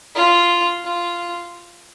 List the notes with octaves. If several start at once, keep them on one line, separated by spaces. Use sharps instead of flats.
F4
F4